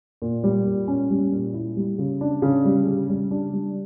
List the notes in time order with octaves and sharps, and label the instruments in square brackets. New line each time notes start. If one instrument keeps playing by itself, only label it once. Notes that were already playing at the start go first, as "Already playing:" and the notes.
[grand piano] A#2
G3
A#2
C#4
G3
A#2
E4
G3
C#3
D4
C#3
G3
C#3
G3
D4
G3